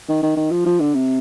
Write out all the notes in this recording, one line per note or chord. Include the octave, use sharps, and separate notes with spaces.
D#3
D#3
D#3
F3
F3
D3
C3